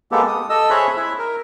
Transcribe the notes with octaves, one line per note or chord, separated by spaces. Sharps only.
G#3 A#3 B3 G4 A4
D#6
A4 D#5 E6
G#4 C5 C#5 E5 B5 F#6
E4 E5
A#4